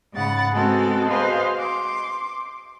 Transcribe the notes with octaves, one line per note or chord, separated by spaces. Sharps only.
G#2 C#3 F#5 B5 A6
G#3 B3 C4 F#4 G#4 A4
F#4 G#4 B4 C5 D#5 F5
C6 D6